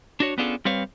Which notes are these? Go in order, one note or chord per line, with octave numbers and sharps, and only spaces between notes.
D4 F#4 C#5
B3 C#4 D4 F4 G#4 A4
G3 C4 B4 C#5 F5